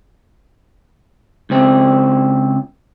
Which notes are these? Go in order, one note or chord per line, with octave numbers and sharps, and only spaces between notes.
C#2 C4